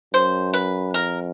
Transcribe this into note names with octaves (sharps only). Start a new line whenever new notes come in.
F#2 C5
B4
F2 A#4